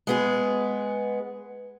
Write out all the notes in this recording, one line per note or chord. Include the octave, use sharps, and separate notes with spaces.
G#3 B3 G#4